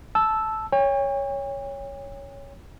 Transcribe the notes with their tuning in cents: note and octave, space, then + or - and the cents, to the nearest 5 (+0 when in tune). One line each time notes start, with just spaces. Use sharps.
A5 -10 E6 +0
C#5 +5 G5 +45